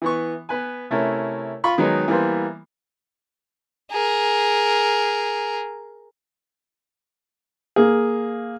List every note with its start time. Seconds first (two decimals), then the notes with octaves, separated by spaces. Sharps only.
0.02 E3 B3 C#6
0.49 B3 B4 G#5
0.90 C3 A3 C#4 E4 A#4
1.64 F4 B5 C#6
1.78 D#3 F#3 G#3 B3 D#4
2.08 E3 G3 A#3 B3 C5
3.91 G#4 A#4
7.76 A#3 G#4